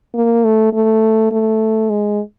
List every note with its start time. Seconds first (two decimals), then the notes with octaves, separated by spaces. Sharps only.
0.15 A#3
0.44 A3
0.73 A3
1.31 A3
1.90 G#3